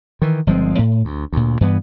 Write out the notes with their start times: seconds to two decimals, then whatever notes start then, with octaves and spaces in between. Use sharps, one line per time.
0.22 D#3 E3
0.47 G1 F3 G#3 C4
0.79 A2
1.05 D2
1.32 D2 A#2
1.61 G2 E3 B3